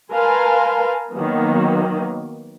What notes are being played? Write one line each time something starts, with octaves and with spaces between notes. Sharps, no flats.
A#4 B4 F5 G#5 A5 C6
D#3 F#3 A#3 B3